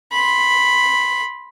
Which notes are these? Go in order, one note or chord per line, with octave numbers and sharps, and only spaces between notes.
B5 C6